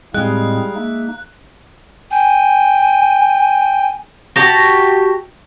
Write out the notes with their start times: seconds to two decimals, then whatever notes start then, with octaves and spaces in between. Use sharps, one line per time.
0.14 A2 G3 G#3 C4 D#4 F5 F#6
0.75 A#3 D#4 E5
2.11 G5 G#5
4.36 F#4 G4 A5